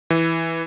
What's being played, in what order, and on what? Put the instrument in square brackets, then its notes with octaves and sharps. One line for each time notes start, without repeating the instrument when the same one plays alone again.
[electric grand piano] E3